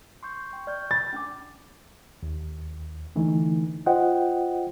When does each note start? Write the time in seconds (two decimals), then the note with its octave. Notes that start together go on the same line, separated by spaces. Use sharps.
0.23 C6 C#6 G6
0.53 G5 C#6
0.67 D5 F6 G6
0.91 B5 A6
1.13 C#4 D4 D6
2.23 D#2
3.16 D3 E3 A3 D#4
3.86 F4 C5 D#5 F#5 G5